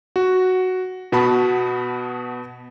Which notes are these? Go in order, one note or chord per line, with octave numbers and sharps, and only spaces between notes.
F#4
B2 B3 F#4 A5 B5